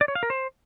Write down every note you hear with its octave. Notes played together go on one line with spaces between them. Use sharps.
D5
C#5
F5
A#4
C5